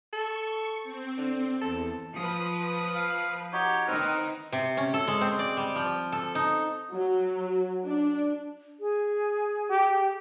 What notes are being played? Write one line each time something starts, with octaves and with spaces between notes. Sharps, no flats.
A4 C#6
C4
D3
E2 A4
F3 B4 D#6
F5
D#4 F#4 G4 C#5
D#3 C4 D#4 A#4 B4
C3
C#4
A4
G#3
C4
D5
G3
F3
A4
D#4
F#3
D4
G#4
G4